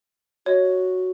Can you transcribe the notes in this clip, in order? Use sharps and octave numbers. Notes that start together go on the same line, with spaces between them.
F#4 C#5 D#5